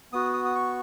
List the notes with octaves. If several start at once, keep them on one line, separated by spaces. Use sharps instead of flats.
B3 F#4 D#6
D#6
D#6
C#6